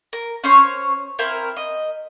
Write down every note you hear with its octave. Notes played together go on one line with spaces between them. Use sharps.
A#4
C#4 C5 C#5
C4 E4 A#4 G#5
D#5